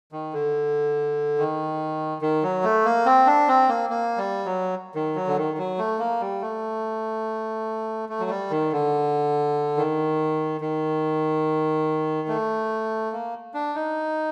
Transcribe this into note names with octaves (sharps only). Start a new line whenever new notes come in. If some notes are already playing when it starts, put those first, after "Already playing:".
D#3
D3
D#3
D#3
F#3
A3
A#3
C4
D4
C4
A#3
A#3
G3
F#3
D#3
F#3
D3
D#3
F#3
A3
A#3
G3
A3
A3
F#3
G3
D#3
D3
D#3
D#3
A3
A#3
D4
D#4